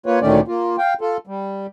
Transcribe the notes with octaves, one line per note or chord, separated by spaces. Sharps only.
A#3 F4 B4 C#5
D2 A#2 D#3 A3 C#4 D5
A#3 F4
F5 G5
F4 A4
G3